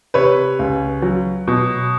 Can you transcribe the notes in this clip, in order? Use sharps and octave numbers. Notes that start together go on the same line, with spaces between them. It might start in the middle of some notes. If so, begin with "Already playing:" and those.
C3 B4 C#5
C#2
F#3
B2